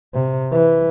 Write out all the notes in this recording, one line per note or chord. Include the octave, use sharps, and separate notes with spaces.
C3
E3